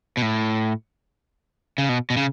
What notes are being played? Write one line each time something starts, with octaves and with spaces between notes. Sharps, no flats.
B2
A2
C#3
B2
B2
C#3